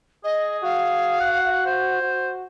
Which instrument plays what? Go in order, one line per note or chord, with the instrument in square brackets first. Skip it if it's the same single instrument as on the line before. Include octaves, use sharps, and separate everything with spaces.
[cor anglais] G#4 [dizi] D#5
[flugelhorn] F#4 [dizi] F5
[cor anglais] F#5
C5
[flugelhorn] F#4